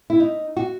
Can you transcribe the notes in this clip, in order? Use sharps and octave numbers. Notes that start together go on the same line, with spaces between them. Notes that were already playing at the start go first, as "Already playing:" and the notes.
E4
D#4
F#4